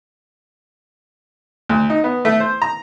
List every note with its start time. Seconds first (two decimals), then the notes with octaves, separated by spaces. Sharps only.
1.69 D2
1.90 D#4
2.04 B3
2.25 A3
2.40 C5
2.62 A#5